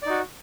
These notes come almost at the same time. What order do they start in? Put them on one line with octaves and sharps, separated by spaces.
D5 D#4 F#4